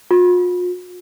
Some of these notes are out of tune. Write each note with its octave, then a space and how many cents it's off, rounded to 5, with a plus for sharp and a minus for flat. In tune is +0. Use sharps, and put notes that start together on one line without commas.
F4 +45